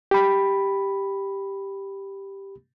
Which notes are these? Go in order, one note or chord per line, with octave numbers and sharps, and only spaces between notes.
G4 B5